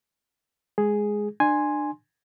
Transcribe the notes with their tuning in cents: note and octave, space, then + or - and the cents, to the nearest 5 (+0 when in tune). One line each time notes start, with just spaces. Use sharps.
G#3 +0 G#4 +0
D4 +30 G#5 +0 C6 +5